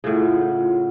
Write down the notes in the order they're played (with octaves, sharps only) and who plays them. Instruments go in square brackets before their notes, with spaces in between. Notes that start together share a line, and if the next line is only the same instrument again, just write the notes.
[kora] A2 C#3 [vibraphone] E4 F4 F#5